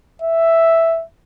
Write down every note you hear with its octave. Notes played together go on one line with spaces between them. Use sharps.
E5